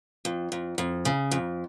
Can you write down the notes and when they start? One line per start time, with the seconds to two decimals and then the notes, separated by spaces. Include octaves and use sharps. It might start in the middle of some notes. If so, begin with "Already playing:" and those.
0.25 F2
0.52 F2
0.78 F2
1.05 C#3
1.31 F2